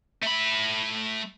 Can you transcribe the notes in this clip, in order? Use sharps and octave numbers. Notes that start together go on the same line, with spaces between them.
A3 B5